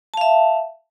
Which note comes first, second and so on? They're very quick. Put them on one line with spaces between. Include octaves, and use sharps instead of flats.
A5 F5 E5